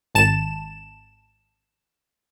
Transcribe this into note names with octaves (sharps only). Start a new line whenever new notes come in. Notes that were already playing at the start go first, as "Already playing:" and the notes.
G#1 A5 E7